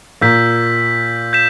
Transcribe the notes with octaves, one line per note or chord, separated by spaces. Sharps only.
A#2 A#3 E6 G6 B6
G6 B6 E7